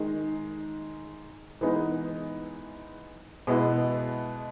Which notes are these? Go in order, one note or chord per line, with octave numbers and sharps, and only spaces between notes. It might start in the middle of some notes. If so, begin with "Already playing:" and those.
Already playing: D#3 G#3 D#4
E3 G#3 B3 D#4
B2 G#3 B3 E4